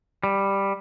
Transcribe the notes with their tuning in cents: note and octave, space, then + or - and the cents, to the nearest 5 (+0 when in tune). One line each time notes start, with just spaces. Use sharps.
G3 +5